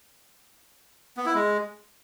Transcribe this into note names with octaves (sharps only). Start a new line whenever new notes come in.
B3
E4
G#3